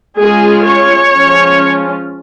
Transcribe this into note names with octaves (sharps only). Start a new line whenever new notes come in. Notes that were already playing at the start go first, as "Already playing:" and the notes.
G#3 C#4 F4 G#4
C#5
F3 G#3 C#4 F4